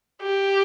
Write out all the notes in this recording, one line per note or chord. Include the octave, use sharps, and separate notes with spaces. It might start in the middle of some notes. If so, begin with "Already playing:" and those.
G4